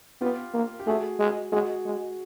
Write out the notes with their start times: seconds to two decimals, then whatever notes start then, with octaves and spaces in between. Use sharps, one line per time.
0.21 B3 F4 G4
0.54 A#3
0.80 G4
0.87 A3 F#4 G#4
1.19 G#3
1.52 G#3 F#4 G#4
1.86 G#3